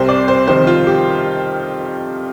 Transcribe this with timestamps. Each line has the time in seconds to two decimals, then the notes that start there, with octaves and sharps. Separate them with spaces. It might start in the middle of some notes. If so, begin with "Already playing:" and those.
Already playing: C2 C3 G3 C5
0.09 D5
0.28 C5
0.48 F2 C3 D#3 G3 C5
0.67 F4
0.87 G4